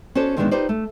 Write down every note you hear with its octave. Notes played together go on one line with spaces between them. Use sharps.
C#4 F#4 A4 C5 D5
A#2 D#3 E3 G#3 B3 D4
D#4 F4 G4 B4 C5 D5
A3